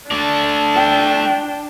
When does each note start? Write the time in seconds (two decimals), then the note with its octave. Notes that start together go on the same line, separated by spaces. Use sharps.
0.11 A3 D4 D5
0.76 G5